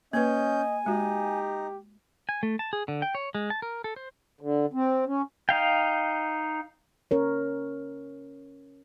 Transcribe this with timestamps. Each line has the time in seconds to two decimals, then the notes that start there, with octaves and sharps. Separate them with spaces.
0.13 A#3 C#4 B4 D#5 G#5 G6
0.86 G#3 D#4 F#4 G4
2.29 G#5
2.43 A3
2.59 A5
2.73 G#4
2.88 D3
3.02 G5
3.15 C#5
3.35 G#3
3.50 A5
3.62 A#4
3.84 A4
3.96 C5
4.41 D3
4.73 C4
5.07 C#4
5.49 D#4 F5 G5
7.11 C#4 A#4 C#5